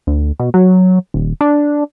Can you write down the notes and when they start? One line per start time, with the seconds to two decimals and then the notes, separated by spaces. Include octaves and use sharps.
0.07 D2
0.39 B2
0.54 F#3
1.14 D#1
1.41 D4